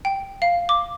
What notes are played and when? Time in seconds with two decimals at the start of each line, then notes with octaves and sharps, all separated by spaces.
0.05 G5
0.42 F5
0.69 D6